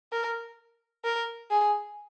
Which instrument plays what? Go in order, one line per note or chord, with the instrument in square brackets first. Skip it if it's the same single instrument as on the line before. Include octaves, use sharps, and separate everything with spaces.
[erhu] A#4
A#4
G#4